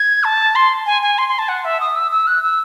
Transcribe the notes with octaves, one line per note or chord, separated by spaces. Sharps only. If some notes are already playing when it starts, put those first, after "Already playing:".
Already playing: G#6
A5
C6
G#5
G#5
C6
C6
A5
F#5
E5
D#6
E6
E6
F#6
E6